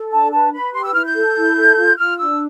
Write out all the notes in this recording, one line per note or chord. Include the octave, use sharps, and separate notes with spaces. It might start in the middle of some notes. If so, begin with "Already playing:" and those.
Already playing: A4
D4 A5
B4 A5
B4 B5
G4 C6
E6
E4 F6
G6
A4
E4
A4
F4
F4 F6
D4 E6